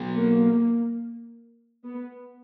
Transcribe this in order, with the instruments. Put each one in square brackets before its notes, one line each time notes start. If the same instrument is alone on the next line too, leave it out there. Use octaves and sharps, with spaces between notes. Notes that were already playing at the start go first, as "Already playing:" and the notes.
Already playing: [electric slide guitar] F#3 B3 F#4
[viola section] A#3
B3